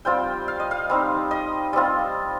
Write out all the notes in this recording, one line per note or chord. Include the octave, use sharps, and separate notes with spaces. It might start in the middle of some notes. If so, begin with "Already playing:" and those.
G3 C4 F4 G5
F5
D#5
F5
G3 C4 D#4
D#5
G3 C4 F4